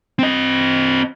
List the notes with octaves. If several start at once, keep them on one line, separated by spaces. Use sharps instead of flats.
C4 D#5